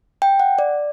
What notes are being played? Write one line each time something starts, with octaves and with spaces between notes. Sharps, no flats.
G5
F#5
D5